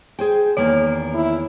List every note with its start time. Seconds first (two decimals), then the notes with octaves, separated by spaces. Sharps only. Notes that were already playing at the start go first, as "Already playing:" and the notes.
0.19 G#4 C5 G5
0.57 E2 D#3 A#3 C#5
1.14 E4